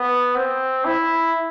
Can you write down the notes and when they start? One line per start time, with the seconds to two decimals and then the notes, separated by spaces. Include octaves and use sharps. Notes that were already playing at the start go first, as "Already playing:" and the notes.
Already playing: B3
0.35 C4
0.85 E4